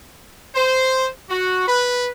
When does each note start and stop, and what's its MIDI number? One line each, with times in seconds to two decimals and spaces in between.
0.55 1.06 72
1.30 1.64 66
1.68 2.08 71